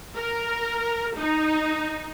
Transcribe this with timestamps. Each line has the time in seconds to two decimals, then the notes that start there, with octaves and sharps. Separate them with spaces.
0.16 A#4
1.17 D#4